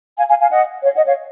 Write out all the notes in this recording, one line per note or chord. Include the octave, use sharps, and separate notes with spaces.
F5 G#5
F5 G#5
F5 G#5
D#5 F#5
C#5 F5
D#5 F#5
C#5 F5